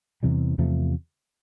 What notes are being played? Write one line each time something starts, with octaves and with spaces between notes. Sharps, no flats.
E2 C3 E3 G3
E2 C3 F3 A3